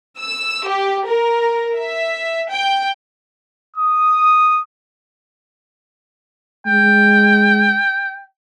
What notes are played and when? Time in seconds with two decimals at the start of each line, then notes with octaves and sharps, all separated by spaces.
0.18 E6
0.66 G4
1.06 A#4
1.78 E5
2.50 G5
3.76 D#6
6.66 G#3 G5